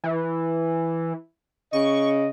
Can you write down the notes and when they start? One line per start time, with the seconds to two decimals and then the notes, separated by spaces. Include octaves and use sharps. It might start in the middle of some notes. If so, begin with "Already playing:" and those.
0.04 E3
1.73 C#3 D#5 C#6